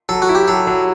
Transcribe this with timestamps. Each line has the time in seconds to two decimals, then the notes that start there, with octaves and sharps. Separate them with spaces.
0.09 F#3 A4
0.22 F#4
0.29 E4
0.35 G4
0.48 F#3 A4
0.67 F#3